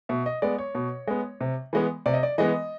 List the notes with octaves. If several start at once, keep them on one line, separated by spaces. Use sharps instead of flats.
B2 E5
D#5
G#3 B3 D5
C#5
B2
G#3 B3
C3
E3 G#3 B3
C3 D5
D#5
D5
E3 G#3 B3 D#5